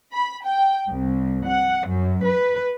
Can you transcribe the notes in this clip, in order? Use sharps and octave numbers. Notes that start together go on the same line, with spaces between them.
B5
G5
C2
F#5
F#2
B4